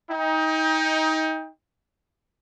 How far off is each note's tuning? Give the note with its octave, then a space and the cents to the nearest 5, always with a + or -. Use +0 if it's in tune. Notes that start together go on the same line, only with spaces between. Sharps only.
D#4 +25 G5 +30